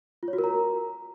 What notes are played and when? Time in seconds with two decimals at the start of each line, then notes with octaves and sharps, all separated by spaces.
0.23 F4
0.28 C#5
0.33 F#4
0.38 A#4
0.44 A#5